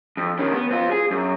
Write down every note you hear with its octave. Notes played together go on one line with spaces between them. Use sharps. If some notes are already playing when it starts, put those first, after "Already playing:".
F2
D#3 C#4
B3
C4 F4
G#4
F#2